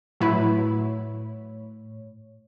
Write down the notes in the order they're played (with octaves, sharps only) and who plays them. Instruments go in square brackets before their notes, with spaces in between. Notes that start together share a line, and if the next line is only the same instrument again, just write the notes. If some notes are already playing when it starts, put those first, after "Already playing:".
[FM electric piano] A2 C#5 [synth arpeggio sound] F#3 E4 B4